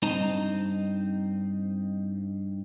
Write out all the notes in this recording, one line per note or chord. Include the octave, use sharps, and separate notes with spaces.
G2 C4 D#4 D#5 A5 A#5